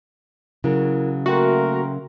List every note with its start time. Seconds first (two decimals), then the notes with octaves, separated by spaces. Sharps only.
0.64 C#3 F#3 E4 A#4
1.26 A3 A#3 F#4 A#4 E5 G5 C6